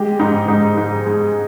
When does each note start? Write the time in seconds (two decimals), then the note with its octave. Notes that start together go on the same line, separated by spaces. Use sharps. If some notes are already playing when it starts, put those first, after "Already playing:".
Already playing: G#3 G4
0.19 G#2 D#4
0.48 G#2 D#4
0.77 G#2
1.06 G#3